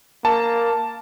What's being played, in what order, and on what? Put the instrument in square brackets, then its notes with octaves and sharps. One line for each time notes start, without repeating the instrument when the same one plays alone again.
[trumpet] A#3 [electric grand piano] A5